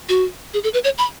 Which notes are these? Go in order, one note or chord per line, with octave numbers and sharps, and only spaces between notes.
F#4
G#4
A4
B4
C#5
B5